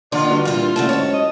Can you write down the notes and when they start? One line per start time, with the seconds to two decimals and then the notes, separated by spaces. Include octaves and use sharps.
0.12 A#1 D3 D#4 F4 D5
0.30 G2 F#4
0.45 A#2 E3 G3 F4
0.76 F#2 D3 E3 A3 A5
0.89 D#2 G#2 C#5
1.14 D#5